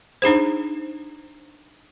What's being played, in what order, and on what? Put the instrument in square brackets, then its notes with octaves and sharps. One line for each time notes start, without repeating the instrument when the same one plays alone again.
[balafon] D4 D#4 G#4 C5